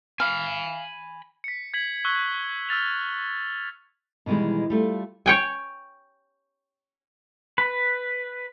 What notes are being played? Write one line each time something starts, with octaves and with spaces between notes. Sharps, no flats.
F5 G#5 B5
B6 C#7
G#6 B6 F#7
C#6 E6 F#6 G7
E6 F6 A6 F7
B2 D#3 E3 G3 G#3
G3 A3 F4
C#5 G5 G#5
B4